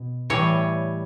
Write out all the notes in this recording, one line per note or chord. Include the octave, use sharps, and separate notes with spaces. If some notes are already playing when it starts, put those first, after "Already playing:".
Already playing: B2
A2 E3 G3 C#5